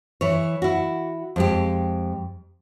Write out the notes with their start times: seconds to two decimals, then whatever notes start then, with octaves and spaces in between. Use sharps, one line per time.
0.21 E3 C#5
0.62 E4 F#4
1.36 F2 G#3 G4